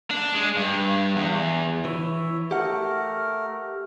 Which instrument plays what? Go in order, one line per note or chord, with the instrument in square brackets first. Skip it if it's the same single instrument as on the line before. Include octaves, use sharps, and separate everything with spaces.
[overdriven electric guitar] D4
G#3
G2
E2
[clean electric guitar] E3 [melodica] C#5 E5
[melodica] A3 A#4 [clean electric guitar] G4 F#5